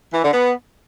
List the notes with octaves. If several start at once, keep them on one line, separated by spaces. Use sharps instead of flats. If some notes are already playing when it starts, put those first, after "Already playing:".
E3
D3
B3